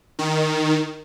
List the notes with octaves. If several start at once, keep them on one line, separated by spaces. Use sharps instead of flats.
D#3